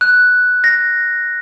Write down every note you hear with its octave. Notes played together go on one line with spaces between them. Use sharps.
F#6
A#6